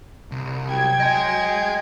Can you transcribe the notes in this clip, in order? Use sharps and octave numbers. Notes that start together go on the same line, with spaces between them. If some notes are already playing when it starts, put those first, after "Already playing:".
C2
F#3 G5 G#6
D#5 G#5